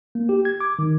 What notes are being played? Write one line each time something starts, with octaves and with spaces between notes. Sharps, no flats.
A#3
G4
G#6
D6
D#3